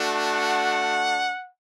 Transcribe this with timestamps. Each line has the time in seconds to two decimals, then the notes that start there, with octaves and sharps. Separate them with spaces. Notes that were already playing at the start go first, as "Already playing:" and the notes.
Already playing: A3 D4 F#4
0.27 F#5